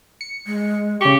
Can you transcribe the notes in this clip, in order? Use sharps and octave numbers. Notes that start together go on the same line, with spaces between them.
C#7
G#3
C#3 G4 G5 C#6